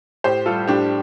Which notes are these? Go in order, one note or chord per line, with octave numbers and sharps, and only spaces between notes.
A2 G4 C5
G3 F4 A4
A2 D4 G4